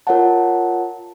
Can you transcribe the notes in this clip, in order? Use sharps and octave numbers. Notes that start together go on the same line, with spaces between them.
F4 A#4 C#5 F#5 A5